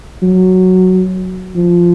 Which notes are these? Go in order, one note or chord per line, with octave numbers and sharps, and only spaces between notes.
F#3
F3